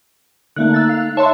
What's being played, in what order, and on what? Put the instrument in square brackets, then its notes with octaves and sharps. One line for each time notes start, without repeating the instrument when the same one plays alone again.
[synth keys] D3 A3 A#3 [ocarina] D#4 [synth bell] F#6
[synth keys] E6 A6
F5
[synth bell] C#5 E5 C6 [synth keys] A5